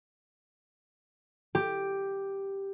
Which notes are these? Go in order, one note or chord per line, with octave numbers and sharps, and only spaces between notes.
G4